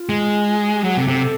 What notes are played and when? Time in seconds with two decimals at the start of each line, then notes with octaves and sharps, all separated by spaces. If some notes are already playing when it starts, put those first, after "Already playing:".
Already playing: F4
0.09 G#3
0.47 F4
0.59 F#4
0.71 G4
0.84 F#3 G#4
0.96 C3 A4
1.08 C3 A4